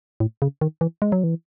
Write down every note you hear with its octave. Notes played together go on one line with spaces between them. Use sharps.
A2
C#3
D#3
E3
G#3
F#3
E3